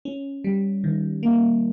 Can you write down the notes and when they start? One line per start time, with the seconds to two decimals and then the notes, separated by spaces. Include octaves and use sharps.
0.05 C#4
0.44 G3
0.84 D#3
1.23 A#3